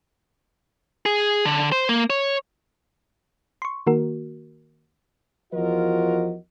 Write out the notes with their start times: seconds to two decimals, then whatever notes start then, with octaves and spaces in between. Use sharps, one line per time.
1.06 G#4
1.45 D3
1.72 C5
1.89 A#3
2.10 C#5
3.62 C6 C#6
3.87 D#3 A#3 F#4 A#4
5.53 E2 F3 F4 F#4 A#4 D#5